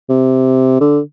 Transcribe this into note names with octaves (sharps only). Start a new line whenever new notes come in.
C3
D3